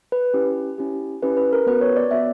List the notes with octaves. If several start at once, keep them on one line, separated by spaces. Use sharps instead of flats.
B4
C#4 E4 G4
C#4 E4 G4
C#4 E4 G4 B4
B4
A#4
B3 F#4 B4
C#5
D5
B3 F#4 E5